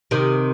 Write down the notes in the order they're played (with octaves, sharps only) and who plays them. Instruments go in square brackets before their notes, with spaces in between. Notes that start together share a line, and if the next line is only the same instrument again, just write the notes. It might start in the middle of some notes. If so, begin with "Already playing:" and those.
[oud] C3 D#3